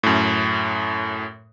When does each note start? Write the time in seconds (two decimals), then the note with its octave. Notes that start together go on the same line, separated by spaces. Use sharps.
0.03 F#2 A2